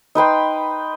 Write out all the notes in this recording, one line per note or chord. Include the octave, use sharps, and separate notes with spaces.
D#4 B4 G5 C6